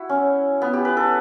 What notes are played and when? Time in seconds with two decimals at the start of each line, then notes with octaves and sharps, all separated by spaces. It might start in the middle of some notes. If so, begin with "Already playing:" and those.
Already playing: E4 F#4
0.09 C#4
0.62 B3
0.73 G4
0.85 B4
0.97 A4